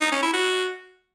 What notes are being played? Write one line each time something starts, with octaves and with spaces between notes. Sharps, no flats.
D#4
C#4
E4
F#4